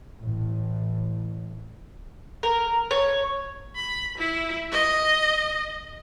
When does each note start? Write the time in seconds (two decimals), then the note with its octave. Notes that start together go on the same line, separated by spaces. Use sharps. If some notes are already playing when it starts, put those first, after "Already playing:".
0.19 A1 A2
2.43 A#4
2.91 C#5
3.76 B5
4.18 E4
4.72 D#5